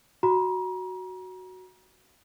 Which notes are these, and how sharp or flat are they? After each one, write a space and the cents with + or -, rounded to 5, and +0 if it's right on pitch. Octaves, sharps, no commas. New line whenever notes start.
F#4 +0 A#5 +35